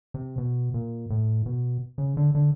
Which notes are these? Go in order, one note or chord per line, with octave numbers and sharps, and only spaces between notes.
C3
B2
A#2
A2
B2
C#3
D3
D3